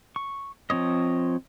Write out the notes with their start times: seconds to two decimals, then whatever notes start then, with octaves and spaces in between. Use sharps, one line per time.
0.16 C#6
0.70 F3 C4 C#5 D#5